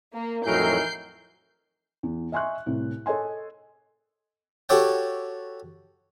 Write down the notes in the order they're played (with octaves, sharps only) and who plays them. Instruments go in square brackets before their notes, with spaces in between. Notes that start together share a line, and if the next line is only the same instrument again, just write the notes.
[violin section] A#3
[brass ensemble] F2 A2 F#3 [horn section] E3 D#4 A#4 [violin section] G6 C7
[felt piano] E2
D#5 E5 G#5 C6 C#6 F#6
C2 A2
A4 C#5 D#5 G#5 C6
[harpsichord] F#4 G4 A4 C#5 F#5 G5